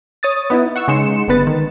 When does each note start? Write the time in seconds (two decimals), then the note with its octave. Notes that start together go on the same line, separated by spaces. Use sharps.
0.23 C#5 D#6 A6
0.50 B3 D#4 E4
0.76 F#5 C#6 E6
0.88 C#3 G#3 D#4 C6 C#7 E7
1.28 G1 D3 B3 B4 A6
1.47 D#3